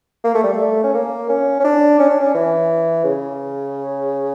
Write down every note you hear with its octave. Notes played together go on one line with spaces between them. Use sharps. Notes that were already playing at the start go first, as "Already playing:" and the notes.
A#3
A3
G3
A3
C#4
A#3
C#4
C#4
D4
C#4
D4
C#4
E3
C#3